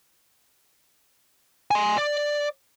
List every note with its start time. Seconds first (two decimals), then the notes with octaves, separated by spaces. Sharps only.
1.71 G#5 C6
1.98 D5